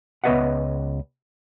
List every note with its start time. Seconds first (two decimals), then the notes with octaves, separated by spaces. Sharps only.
0.24 C#2 B3 B4 D#5 E5 F#5